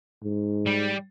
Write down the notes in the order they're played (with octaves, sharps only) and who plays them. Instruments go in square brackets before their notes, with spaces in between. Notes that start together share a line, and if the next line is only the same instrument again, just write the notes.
[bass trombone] G#2
[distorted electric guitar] G3